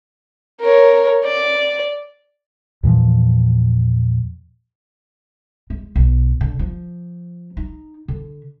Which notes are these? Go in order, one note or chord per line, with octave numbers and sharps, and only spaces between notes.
A#4 C#5
D5
E2 A#2 E3 F3
G#3
B1
D3
F3
D#4
D3